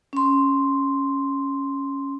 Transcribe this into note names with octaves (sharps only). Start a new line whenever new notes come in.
C#4 C6